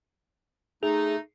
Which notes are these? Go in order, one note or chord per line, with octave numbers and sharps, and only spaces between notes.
A3 D#4 G#4